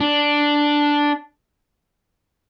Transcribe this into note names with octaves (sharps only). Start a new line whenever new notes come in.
D4